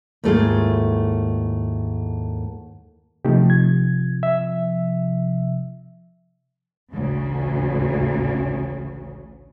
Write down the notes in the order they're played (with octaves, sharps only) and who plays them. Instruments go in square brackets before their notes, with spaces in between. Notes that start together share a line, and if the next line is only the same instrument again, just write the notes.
[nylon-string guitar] D#2 G#2 A3 E4 F4 G#4
[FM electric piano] C3 F3 [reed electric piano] A3 D#4 G4
[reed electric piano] G#6
E5
[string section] A1 D2 C#3